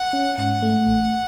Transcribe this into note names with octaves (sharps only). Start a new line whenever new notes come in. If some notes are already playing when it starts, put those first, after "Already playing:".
Already playing: F#5
C#4
G#2 F#5
A3
A1